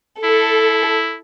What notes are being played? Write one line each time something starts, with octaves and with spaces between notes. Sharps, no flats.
E4 A4